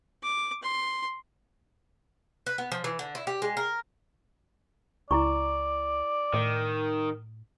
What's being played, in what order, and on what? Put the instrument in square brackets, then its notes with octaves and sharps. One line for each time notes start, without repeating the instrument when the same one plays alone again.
[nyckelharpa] D6
C6
[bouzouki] B4
B3
F3
E3
D3
E4
G4
G#3
A#4
[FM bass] C#2 [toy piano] E4 A#5 C#6 [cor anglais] D5
[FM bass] A2 [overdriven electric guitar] D#3